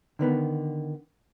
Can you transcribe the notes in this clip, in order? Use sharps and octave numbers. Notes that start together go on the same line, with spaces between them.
D3 D#3 B3